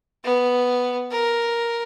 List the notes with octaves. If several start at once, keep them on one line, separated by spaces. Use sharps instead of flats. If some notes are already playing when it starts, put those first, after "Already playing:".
B3
A#4